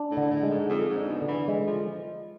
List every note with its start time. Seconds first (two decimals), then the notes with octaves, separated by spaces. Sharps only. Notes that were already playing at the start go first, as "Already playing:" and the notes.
Already playing: D4
0.11 A2
0.17 D3
0.30 A2
0.43 G#3
0.50 G#2
0.69 F2 G#4
0.89 G#2
0.96 D4
1.09 B2
1.22 D3
1.28 E3
1.48 E3 G#3
1.67 F3